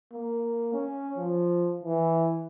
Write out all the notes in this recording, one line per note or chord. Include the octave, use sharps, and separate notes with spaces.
A#3
C#4
F3
E3